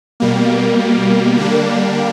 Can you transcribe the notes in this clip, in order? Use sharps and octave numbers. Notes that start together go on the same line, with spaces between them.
B2 G3 A#3
D3 G3 A#3 D4